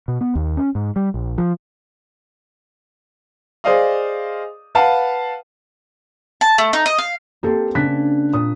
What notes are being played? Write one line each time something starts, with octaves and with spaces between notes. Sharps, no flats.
B2
B3
D#2
C#4
G#2
G3
A#1
F3
G#4 C5 D5 D#5 F5 D#6
B4 F5 F#5 A5
A5
A3
D#4
D#5
F5
A#3 C4 G4 A4
C#3 D4 F#6 G#6 B6
A#2 D#6